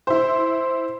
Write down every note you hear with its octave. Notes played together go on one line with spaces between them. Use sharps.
E4 C5